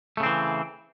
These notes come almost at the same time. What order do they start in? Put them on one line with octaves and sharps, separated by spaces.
A3 C#3 C4 E3